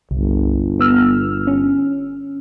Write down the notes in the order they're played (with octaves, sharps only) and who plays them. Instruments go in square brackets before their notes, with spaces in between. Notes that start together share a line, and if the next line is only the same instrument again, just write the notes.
[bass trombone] G1 [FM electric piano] C2
[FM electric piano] B3 E6 F6
C#4